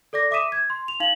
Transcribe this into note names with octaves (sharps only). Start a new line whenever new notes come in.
A4 D5 D6 A#6
E5 D6 D#6 B6 D#7 E7
G#6
C6
F7
D#4 F5 F#7